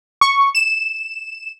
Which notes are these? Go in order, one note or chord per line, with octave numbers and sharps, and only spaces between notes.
C#6
E7